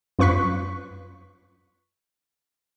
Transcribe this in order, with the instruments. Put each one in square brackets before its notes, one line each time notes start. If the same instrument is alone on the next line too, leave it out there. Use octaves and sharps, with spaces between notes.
[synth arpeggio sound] F#2 F4 B4 C#6 F#6 B6